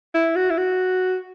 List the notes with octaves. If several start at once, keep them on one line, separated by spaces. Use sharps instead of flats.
E4
F#4
E4
F#4